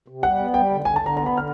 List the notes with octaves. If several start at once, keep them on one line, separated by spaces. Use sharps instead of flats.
C3
G3 F#5
B3
G3 G5
D3
D3 G#5
A5
D3
A#5
B3 A#5
B5
D3 F6